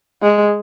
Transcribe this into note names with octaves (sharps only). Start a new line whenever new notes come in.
G#3